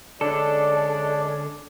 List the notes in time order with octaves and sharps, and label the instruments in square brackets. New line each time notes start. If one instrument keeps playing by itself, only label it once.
[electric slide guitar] D3 A4 [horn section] G#3 C#4 D4 [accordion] D5